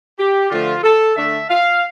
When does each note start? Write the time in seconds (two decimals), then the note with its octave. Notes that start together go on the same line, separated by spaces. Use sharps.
0.18 G4
0.49 D3 F3 A3 F4
0.83 A4
1.15 D3 A3 D4 E5
1.48 F5